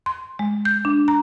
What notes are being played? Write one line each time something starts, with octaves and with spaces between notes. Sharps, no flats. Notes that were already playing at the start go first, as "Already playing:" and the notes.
C6
G#3
G6
D4
A#5